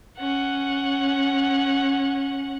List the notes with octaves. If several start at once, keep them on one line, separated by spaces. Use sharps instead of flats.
C#4 F#5